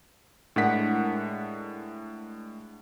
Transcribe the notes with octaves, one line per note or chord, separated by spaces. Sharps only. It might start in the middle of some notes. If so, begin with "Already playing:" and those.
A2 G#3 D4 A#4 F#5 B6